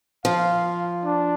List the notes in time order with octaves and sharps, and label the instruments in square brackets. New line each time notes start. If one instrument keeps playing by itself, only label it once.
[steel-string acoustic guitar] F3 [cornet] F5
[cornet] D4